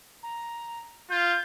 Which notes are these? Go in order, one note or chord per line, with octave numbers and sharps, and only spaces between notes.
A#5
F4 G6